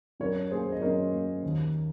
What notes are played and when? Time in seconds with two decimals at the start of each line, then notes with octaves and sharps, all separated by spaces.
0.20 F#2 A#4 C#5
0.51 A#3 G#4 C5
0.72 D#5
0.81 F#2 A#4 C#5
1.13 A#3
1.43 D#2